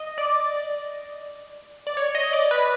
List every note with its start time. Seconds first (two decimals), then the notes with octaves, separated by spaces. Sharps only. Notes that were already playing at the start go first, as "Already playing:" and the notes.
Already playing: D#5
0.18 D5
1.87 D5
1.97 C#5
2.15 D#5
2.33 D5
2.51 B4